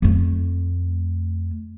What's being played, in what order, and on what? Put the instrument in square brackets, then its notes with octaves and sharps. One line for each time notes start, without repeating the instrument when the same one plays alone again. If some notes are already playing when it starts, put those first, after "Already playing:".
[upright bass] F2 A3